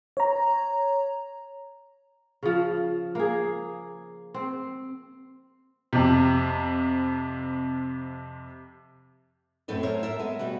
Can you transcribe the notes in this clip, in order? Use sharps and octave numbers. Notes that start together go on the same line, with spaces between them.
C#5 A#5
C#3 F3
A#3 G#4
C4
F2 C3
F#2 A2 C4 A4 B4
A4 A#4 C5 C#5 E5
A4 A#4 E5
G#3 B3
B2 G3 F#4 B4